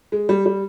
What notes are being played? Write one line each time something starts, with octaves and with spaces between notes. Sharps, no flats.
G#3
G3
G3